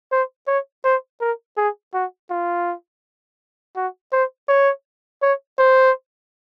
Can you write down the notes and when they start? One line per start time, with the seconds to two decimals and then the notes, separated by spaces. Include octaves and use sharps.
0.11 C5
0.47 C#5
0.84 C5
1.21 A#4
1.57 G#4
1.94 F#4
2.30 F4
3.76 F#4
4.12 C5
4.48 C#5
5.22 C#5
5.58 C5